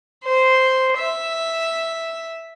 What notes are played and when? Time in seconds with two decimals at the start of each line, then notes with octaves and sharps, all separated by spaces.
0.24 C5
0.98 E5